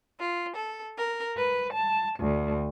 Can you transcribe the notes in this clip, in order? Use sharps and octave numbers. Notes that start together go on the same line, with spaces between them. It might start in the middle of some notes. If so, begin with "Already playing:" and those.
F4
A4
A#4
B4
A5
D2